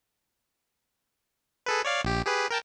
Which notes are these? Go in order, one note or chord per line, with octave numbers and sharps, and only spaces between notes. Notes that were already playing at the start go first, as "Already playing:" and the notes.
G#4 A4 B4
C#5 D5 F5
A#1 G4
G4 G#4 B4
A#4 G5 A5